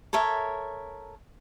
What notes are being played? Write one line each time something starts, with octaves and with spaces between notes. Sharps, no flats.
A4 A#4 C#5 E5